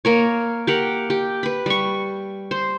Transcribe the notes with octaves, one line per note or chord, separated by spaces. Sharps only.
A#3 A#4 C#5
G4 A#4 F#5
G4
B4 B5
G3 C#6
C5